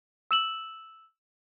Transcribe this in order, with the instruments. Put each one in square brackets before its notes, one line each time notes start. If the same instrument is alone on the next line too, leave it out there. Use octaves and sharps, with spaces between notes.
[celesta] E6 E7 F#7